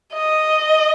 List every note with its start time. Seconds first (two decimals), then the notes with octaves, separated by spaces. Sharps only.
0.13 D#5